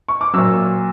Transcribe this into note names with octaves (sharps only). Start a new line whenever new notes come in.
C#6
D6
A#2 F#3 E6